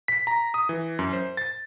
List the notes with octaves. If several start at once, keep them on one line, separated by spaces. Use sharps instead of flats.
B6
A#5
D#6
E3
F#2
C5
A6